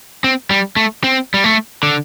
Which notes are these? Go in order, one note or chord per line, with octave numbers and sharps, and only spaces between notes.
C4
G3
A3
C4
G3
A3
D3